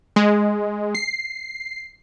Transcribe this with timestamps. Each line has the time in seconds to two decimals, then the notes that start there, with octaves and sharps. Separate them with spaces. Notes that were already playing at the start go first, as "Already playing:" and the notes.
0.16 G#3
0.95 C7